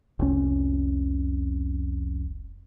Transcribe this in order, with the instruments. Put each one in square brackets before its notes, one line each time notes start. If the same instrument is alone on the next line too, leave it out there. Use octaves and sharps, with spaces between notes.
[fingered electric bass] F1 C2 C#4